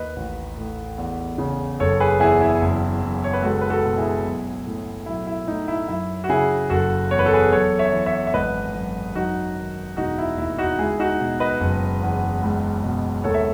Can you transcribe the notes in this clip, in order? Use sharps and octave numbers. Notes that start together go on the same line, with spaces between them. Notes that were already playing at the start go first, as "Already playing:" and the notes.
Already playing: D#2 B4 D#5
A1
A2
E2
C#3
F#1 A4 C#5
G#4 B4
E2 E4 G#4
E4
F#1
F#2
C#5
B4
C#2 F#4 A4
B4
F#4 A4
B2
E4 G#4
B1
A2
B1 E4
E4
A2 D#4
E4
F#2 E4
F#4
C#3 E4 G#4
F#1 F#4 A4
E2 C#5
B4
A4
G#4 B4
F#2 A4 C#5
C#5 E5
E3
C#5 E5
E5
G#1 B4 D#5
F#2
F#2 D#4 F#4
D#3
E1 D#4 F#4
E4
D#2 E4
D#4 F#4
C#2 E4 G#4
D#4 F#4
B2
B4 D#5
F#1
E2
C#2
B2
D#2 A4 C#5
E5